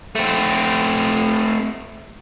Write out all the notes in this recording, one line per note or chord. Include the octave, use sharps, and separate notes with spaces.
A3 C4